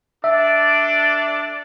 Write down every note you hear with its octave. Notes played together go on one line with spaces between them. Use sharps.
D4 A4 D5 E5